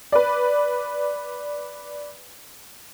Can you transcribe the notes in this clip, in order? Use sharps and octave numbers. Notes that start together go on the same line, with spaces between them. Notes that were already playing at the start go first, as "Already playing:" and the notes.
B4 D5